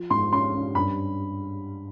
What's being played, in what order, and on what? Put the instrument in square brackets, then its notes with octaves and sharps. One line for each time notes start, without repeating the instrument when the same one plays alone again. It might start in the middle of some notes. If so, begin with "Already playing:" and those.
Already playing: [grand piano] F3
[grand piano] G#2 [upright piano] C6
[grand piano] C#4 [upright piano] C6
[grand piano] C#4
[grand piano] G2 [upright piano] B5